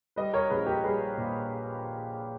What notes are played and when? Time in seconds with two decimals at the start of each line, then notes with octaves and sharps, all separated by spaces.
0.16 G3 B4 D#5
0.33 A#4 C#5
0.50 A#1 G#4 B4
0.67 G4 A#4
0.84 G3 G#4 B4
1.17 A#2